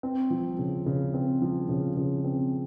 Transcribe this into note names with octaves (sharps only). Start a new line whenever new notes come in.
C4
F3
C#3
C#3
C4
F3
C#3
C#3
C4